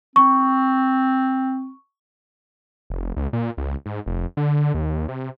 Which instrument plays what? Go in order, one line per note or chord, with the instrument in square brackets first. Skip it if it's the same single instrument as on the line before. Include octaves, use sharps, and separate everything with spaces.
[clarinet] C4 [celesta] C#6
[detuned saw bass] F1
C#2
A#2
C#2
G#2
F1
D3
D#2
C3